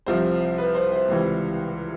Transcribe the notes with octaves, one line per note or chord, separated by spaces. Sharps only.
C2 C3 F3 C5
B4
C5
C5
C#2 C3 E3 G3